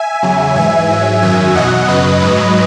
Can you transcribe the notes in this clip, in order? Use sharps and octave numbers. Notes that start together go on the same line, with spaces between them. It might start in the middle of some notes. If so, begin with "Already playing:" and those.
Already playing: E5 G#5
E2 C#3 F#3
G#2 E3 E5 G#5
G#2 F#3
F#2 D#3 F#3 E5 G#5
E2 B2 F#3 D#5 F#5
F#2 C#3 F#3 B4 D#5
G#2 F#3 B4 D#5